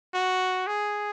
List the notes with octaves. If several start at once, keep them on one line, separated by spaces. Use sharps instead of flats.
F#4
G#4